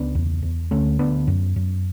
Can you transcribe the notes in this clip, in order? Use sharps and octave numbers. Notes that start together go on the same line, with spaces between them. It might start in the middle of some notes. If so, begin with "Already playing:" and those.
Already playing: C#2 B3 D4
E2
E2
D2 A3 C#4
D2 B3 D4
F#2
F#2